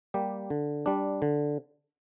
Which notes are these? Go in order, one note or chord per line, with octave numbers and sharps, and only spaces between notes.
G3 A#3 G4
D3
G3 D4
D3